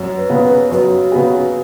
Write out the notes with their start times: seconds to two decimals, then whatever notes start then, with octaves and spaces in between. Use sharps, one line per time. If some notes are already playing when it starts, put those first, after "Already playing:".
Already playing: F#2
0.16 B4
0.30 C#3 B3 G#4
0.44 B4
0.72 F#2 F#4
1.12 C#3 B3 G#4